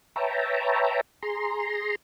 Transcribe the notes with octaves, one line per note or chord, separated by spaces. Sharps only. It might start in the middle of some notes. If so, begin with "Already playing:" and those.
B4 C#5 E5 G5 A5 A#5
G#4 A#5 C6